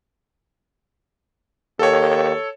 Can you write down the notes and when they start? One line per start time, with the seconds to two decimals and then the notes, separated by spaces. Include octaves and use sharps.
1.79 D#2 A4 C#5